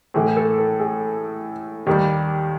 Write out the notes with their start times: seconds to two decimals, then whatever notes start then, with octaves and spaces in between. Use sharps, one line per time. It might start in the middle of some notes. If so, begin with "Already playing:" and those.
0.14 A2 E3 A3 G#4
0.37 A4
0.58 A4
0.80 G#4
1.86 D#2 D#3 G3 G4